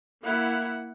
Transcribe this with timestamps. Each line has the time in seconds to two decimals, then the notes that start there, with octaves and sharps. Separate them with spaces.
0.23 A#3 E4 F#5